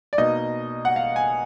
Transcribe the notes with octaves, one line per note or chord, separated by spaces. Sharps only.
D5
B2 A#3 D#4 D#5
F#5
F5
G#5